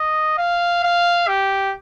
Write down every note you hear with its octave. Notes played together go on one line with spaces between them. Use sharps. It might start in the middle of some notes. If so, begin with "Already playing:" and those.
Already playing: D#5
F5
F5
G4